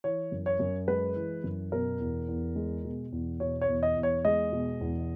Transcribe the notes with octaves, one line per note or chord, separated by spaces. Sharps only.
E3 C#5
F#2
C#5
F#2
G#3 B4
E3
F#2
B2 A#4
E2
E2
G#3
B2
E2
B2 C#5
C#5
E2
D#5
E2
C#5
G#3 D#5
B2
E2